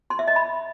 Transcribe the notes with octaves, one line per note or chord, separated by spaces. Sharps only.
C6
E5
D#5
B5